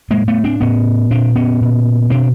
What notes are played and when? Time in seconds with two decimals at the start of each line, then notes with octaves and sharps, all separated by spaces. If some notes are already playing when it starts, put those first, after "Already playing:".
0.10 A2 G#3 A#3
0.28 A3 B3
0.44 C4 D4
0.61 A2 B3 C#4
1.11 A#2 C4 D4
1.35 B3 C#4
1.61 A#2
2.10 B2 C4 D4